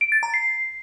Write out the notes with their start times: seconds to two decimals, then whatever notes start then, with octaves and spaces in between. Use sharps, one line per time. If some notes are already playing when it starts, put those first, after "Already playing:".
0.01 D7
0.12 A6
0.23 A#5
0.34 C7